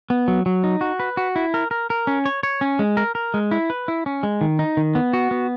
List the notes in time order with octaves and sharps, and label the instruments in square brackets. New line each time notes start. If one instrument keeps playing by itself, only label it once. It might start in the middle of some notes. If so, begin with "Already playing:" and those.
[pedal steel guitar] B3
F#3
F#3
D#4
F#4
B4
F#4
E4
A#4
A#4
A#4
C#4
C#5
C#5
C#4
G#3
A#4
A#4
G#3
E4
B4
E4
C#4
G#3
D#3
D#4
D#3
B3
F#4
B3